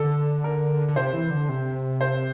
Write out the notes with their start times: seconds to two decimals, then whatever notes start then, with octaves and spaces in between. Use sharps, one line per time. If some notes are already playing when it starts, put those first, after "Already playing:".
Already playing: D3 A4
0.44 A#4
0.89 D3
0.96 C3 C5
1.13 E3
1.30 D3
1.49 C3
2.01 C5